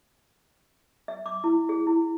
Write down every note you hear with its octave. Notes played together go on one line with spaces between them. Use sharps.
E5
D6
E4
G#4
E4